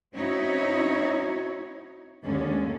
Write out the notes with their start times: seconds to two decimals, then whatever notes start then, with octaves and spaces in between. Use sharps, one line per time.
0.14 C4 C#4 D#4 E4 F#4 C#5
2.23 D#2 D3 G#3 C#4